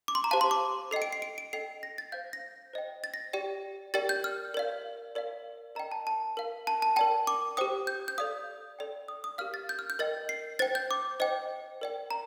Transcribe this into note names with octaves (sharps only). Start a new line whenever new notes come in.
D6
C6
A#5
G4 C5 F5 A5
C6
D6
A4 D#5 G5 C7
D7
C7
D7
D7
A4 D#5 G5 C7
A#6
A6
C5 F5 G6
A#6
C5 D#5 G5
A6
A#6
G4 D5 G5
G4 A#4 D5 G5 A6
G6
F6
A#4 D5 F5
A#4 D5 F5
A#4 D#5 G5 A#5
A5
A5
A#4 F5
A5
A5
A#4 D5 G5 A5
D6
G4 C5 G5 D#6
G6
G6
A4 D5 F5 D#6
A4 D5 G5
D#6
D#6
G4 A#4 F5 F6
A6
G6
F6
G6
A#4 D#5 G5 A6
C7
C5 G5 A6
G6
D6
C5 D#5 G5
A#4 D5 G5
A#5